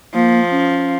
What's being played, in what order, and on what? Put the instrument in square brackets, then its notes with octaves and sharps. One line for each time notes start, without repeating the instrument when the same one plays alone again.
[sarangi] F3 [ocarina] A#3
[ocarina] C#4